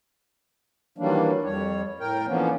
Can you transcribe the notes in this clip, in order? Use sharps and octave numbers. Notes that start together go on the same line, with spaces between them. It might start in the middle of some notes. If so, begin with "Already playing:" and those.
D#3 E3 F#3 G3 A#3 D4
F2 G3 C#5
A2 A#4 G5
D3 E3 F3 A#3 B3 C#4